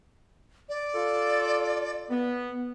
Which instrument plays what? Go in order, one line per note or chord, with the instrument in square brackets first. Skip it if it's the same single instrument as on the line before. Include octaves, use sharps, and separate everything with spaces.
[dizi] D5
[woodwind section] F4 A4
B3